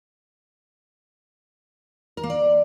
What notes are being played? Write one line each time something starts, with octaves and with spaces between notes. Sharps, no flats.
A#4
A#3
D5